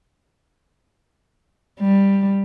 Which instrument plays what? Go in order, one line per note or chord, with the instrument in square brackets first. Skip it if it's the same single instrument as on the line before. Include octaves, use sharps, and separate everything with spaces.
[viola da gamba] G3